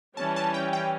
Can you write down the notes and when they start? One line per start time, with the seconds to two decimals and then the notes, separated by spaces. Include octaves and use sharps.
0.17 E3 G3 C#4 A5
0.36 A5
0.54 G5
0.73 G5